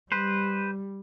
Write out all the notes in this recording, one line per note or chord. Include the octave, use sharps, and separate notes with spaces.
G3 B4 C5